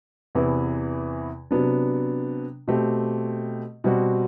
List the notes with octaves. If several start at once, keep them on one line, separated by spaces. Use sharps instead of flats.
E2 C3 E3 B3 E4
C3 F#3 B3 D4
B2 A3 C4 G4
B2 G3 C4 F#4